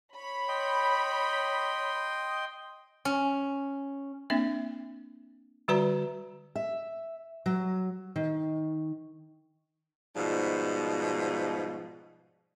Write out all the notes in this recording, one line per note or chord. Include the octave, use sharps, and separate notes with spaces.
C#5 B5
D#5 G5 C6
C#4
A#3 C4 D4 E5
D3 G3 F#4 B4 D5 A#5
E5
F#3
D#3
G#2 B2 F3 G3